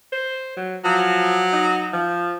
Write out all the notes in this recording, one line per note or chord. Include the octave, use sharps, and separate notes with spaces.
C5
F#3
F3 F#3
D#4
F3